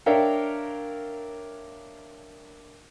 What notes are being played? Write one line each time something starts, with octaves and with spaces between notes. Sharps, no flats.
D4 A#4 C#5 E5 F5 G5